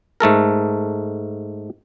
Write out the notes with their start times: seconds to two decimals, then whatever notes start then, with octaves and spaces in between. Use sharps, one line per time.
0.20 G#2 A3 A4 A#4